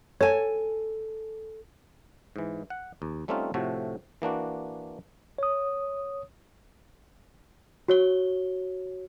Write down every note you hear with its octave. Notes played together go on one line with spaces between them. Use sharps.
A4 C#5 G#5
G#2 E3
F#5
D#2
G3 A3 C4 C#4 D#4 F4
A2 C3 F3 A3 F#4
E3 A#3 D4 F#4
C#5 D#6
F#4 C#5 G7